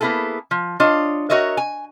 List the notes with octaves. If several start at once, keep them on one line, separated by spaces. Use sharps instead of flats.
A#3 B3 E4 G#4 A4
F3
D4 F4 C#5 D#5
F#4 A#4 C#5 D#5 E5
G#5